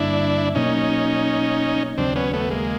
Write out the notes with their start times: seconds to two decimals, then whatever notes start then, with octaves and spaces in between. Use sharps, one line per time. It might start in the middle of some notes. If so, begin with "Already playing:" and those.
Already playing: G2 D3 G3 A#3 D4 E4
0.55 B2 F#3 A#3 C#4 D#4
1.97 D#2 C#3 F#3 C4 D4
2.16 B3 C#4
2.33 A3 B3
2.50 G#3 A#3